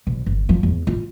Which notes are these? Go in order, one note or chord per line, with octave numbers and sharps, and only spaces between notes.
B1
G1
F3
E2
F4